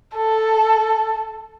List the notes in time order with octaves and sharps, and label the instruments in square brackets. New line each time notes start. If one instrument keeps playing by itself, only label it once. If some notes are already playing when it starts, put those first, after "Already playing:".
[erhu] A4